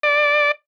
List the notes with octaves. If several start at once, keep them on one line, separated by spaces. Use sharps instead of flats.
D5